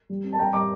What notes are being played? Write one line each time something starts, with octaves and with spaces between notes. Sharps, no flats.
G3
C4
A5
G3 G5 A#5
G3 A#5 D6